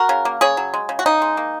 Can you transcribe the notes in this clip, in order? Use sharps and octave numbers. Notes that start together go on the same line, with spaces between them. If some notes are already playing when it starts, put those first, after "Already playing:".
Already playing: F#4 A#4
C#3
A#3
C#3 G#4 C#5
F#3
G#3
C#3
F#4
C#3 D#4
G#3
A#3